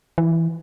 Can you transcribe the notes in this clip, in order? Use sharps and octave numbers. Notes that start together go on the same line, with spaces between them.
E3